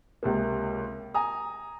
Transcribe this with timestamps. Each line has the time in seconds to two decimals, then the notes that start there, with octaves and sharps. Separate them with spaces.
0.23 C#2 C3 A#3
1.14 G#5 A#5 D#6